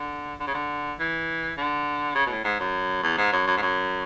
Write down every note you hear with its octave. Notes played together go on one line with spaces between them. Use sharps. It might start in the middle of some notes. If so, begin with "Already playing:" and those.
Already playing: D3
D3
C#3
D3
E3
D3
C#3
B2
A2
G#2
F#2
E2
G#2
F#2
F#2
G#2
F#2